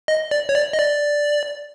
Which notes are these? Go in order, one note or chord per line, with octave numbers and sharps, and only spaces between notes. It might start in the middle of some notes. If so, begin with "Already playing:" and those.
D#5
D5
C#5
D5
D#5
D5